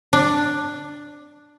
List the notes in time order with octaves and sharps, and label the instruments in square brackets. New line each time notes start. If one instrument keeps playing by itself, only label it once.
[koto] D4